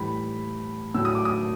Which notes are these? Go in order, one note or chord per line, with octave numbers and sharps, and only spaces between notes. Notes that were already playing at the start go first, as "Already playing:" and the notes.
Already playing: A2 E3 G3 B5
A2 F#3 E6
D#6
D6
D#6